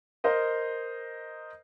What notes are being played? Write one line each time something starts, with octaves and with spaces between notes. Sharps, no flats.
A#4 C5 D#5